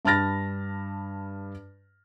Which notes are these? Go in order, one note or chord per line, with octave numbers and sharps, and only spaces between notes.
G2 A5 B5 F6 A6 A#6